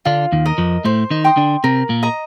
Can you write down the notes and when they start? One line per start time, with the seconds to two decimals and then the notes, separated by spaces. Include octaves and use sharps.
0.05 D3 D4 F4
0.32 D#2 D#3
0.46 A#4 D#5
0.58 F2 F3
0.84 A2 A3 C5
1.11 D#3 D#4
1.24 G5 C6 D#6
1.37 D3 D4
1.64 C3 C4 A#4
1.89 A#2 A#3
2.03 D#5 A#5